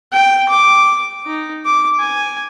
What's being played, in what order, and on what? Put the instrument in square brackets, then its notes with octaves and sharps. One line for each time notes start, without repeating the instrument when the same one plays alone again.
[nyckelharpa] G5
D6
D#4
D6
G#5